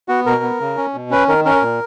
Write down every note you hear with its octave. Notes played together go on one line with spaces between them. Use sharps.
B3 F#4
B2 A#4
B3
C#3
C#4
B2
C#4 B4
D#3 A#4
C#4 A#4
A#2